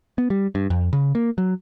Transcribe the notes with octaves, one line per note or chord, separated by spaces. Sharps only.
B3
G3
G2
F2
C#3
A#3
F#3